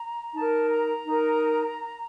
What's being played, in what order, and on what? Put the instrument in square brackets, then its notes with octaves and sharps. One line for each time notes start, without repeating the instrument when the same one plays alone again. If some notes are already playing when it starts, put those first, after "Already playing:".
Already playing: [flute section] A#5
D#4 A#4 A5
A#5
D#4 A#4